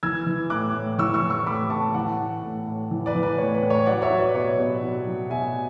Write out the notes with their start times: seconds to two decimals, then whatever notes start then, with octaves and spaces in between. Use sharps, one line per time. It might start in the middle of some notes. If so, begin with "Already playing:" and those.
0.03 E3 E6 G#6
0.27 E3
0.50 A2 D6 F#6
0.74 A2
0.98 E3 C#6 E6
1.14 C#6 E6
1.22 E3
1.30 C#6 E6
1.46 A2 B5 D6
1.70 A2 A5 C#6
1.94 E3 F#5 A5
2.19 E3
2.42 A2
2.67 A2
2.91 E3
3.06 B4 D5
3.15 E3
3.23 B4
3.38 A2 C#5
3.55 B4
3.62 A2
3.70 C#5
3.86 F#3 D5 F#5
4.02 C#5 E5
4.10 F#3
4.18 B4 D5
4.34 B2 C#5
4.59 B2
4.82 F#3
5.07 F#3
5.30 B2 E5 G#5